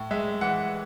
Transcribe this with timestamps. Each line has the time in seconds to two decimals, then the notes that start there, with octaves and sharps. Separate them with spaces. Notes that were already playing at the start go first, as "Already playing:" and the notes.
Already playing: A2
0.11 G#3 E5
0.41 E3 F#5